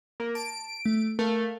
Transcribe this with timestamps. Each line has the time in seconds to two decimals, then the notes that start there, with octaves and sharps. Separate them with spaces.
0.20 A#3
0.35 A5 D7
0.85 A3
1.19 A3 A#4 F5